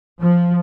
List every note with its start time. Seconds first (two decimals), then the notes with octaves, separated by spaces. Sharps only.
0.21 F3